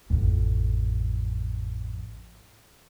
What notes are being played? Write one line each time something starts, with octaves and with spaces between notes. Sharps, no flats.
A1 F2